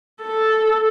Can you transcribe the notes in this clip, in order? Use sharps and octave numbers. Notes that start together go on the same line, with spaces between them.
A4